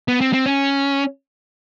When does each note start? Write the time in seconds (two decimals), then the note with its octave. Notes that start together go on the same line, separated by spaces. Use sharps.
0.08 B3
0.21 C4
0.33 C4
0.46 C#4